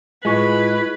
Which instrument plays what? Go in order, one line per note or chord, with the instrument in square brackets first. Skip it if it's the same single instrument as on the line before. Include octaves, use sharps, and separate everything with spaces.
[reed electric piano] A2 F4 C#6 [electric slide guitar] G#3 [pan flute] E4 [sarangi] B4